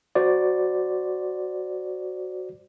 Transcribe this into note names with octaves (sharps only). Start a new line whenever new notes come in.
F#4 C5 D5